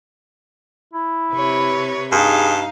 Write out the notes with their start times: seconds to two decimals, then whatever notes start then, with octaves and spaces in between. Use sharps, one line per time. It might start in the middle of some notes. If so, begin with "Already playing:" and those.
0.93 E4
1.32 C3 B4 C#5
2.12 G2 D#4 G#4 F5